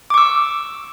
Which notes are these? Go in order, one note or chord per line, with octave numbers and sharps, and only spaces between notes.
C#6 D6 E6